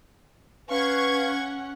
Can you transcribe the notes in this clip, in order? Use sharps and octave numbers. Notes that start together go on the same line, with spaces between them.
C#4 B4 F5 F#5 C#6 G#6